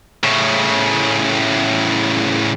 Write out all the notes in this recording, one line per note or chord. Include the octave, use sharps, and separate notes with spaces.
A2 C#3